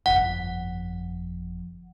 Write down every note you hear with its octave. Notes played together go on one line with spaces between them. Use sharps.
G1 F2 F#5